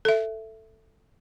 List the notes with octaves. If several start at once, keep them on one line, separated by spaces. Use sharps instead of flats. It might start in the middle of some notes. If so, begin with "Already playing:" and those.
A4 E5